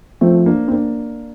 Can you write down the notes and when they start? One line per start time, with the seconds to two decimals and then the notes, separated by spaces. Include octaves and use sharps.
0.21 F3 A3 C4
0.46 A#3 D4
0.68 C4
0.72 A#3 D4